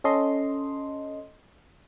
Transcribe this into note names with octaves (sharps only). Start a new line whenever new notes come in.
C#4 A4 D#5 C6